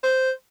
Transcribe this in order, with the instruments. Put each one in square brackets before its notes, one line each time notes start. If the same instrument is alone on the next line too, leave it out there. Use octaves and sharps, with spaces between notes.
[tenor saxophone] C5